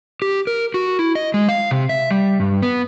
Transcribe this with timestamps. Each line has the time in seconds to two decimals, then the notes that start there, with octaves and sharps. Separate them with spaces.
0.22 G4
0.47 A#4
0.74 F#4
0.99 E4
1.15 D#5
1.34 G#3
1.48 F5
1.71 C3
1.89 E5
2.11 G3
2.40 G2
2.63 B3